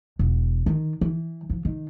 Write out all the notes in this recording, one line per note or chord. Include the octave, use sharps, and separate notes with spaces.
E1
D#3
E3
F3
D#3